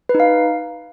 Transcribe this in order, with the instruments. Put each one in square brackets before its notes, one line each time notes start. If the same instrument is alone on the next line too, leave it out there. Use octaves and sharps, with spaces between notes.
[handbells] B4
D#4
F5